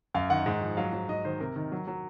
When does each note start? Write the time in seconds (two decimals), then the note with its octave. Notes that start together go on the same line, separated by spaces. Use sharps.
0.14 F#2 F5
0.30 D#3 F#5
0.46 G#2
0.61 F3
0.77 F#3 F5
0.93 F#3
1.09 G#2 D#5
1.25 D#3 C5
1.40 C3 A#4
1.56 D#3
1.72 F#3
1.87 F#3